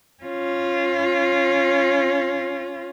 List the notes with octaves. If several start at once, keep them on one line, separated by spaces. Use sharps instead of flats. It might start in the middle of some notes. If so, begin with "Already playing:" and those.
C#4 F4